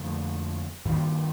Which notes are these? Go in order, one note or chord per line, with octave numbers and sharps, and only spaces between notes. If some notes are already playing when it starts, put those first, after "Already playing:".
Already playing: F2 D3 F3 A3
G2 D#3 G3 A#3